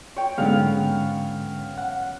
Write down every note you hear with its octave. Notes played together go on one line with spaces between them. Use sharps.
C#5 G5
G#2 D3 F#3 G#3 B3 C#4 F5
F#5